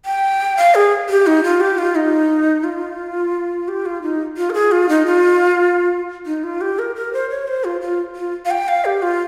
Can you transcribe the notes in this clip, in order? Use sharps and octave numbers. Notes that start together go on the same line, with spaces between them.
G5
F5
G#4
G4
D#4
F4
G4
F4
D#4
F4
G4
F4
D#4
F4
A#4
G#4
F4
D#4
F4
D#4
F4
G4
A#4
A#4
C5
C#5
C5
F4
F4
F4
F5
G5
F5
G4
F4